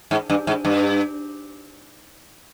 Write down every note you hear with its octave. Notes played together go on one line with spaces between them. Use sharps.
G#2
G2
G#2
G2